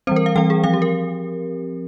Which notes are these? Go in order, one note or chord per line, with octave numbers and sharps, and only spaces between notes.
E3 G3 C4 C5
A#4
F5
E3 G3 C4 G5
G#4
F3 C4 F5
G4
A#4